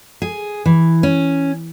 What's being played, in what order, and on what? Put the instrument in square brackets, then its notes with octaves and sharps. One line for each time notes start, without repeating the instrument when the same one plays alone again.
[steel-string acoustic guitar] G#4
E3
C#4